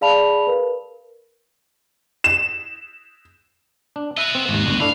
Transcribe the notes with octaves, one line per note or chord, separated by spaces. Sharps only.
G#4 D5 F5 A5 B5 F7
A#4 B4
E7
D4
F#4 D#5 E5
C4
G#1 D#2
G1 D2
A3 D4 E4 F5